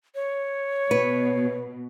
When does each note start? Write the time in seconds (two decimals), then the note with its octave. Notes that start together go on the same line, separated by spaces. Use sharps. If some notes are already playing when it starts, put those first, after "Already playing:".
0.15 C#5
0.91 B2 B4